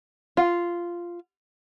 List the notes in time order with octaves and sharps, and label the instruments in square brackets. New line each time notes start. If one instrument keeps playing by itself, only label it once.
[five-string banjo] F4